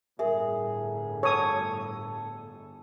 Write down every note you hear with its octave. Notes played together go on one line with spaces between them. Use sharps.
G1 A2 G#4 A#4 E5
A4 C#5 D#6